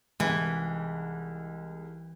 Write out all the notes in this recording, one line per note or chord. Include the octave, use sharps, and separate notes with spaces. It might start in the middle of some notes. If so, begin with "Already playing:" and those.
C2 G#2 E3